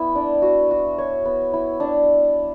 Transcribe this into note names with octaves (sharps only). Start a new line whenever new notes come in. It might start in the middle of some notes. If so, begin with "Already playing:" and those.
Already playing: B3 E4
D4
F#4
F#4
C#5
B3
E4
D4